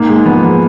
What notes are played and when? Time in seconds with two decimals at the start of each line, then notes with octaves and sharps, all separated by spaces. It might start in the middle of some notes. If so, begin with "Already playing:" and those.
Already playing: G#2 A#3
0.09 G#3
0.25 F3 B3
0.43 F3